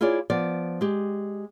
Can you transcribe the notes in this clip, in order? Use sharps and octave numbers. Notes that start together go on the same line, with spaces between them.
E4 F4 G#4 C#5 D5
F3 B3 D5
G#3 G4